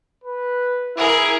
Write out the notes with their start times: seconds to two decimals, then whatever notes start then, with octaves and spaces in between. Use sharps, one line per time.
0.24 B4
0.97 E4 G#4 A#4